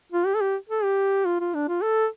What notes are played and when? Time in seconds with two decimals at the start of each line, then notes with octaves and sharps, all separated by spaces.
0.12 F4
0.26 G4
0.35 A4
0.41 G4
0.69 A4
0.84 G4
1.25 F4
1.40 F4
1.54 D4
1.68 F4
1.82 A4